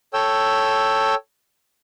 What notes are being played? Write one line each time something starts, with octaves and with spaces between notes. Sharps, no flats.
A4 C#5 G5 E6